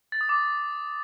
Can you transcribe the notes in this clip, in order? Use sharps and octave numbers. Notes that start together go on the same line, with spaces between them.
A6
D#6
D6